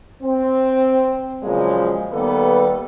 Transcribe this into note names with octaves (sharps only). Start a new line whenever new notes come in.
C4
A#2 C#3 F3 F#3 G#3
D#3 G3 A#3 B3 A4 B4